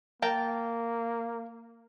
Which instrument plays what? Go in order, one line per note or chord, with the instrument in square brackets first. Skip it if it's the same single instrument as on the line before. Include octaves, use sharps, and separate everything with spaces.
[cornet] A#3 [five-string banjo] A#4 G5 A5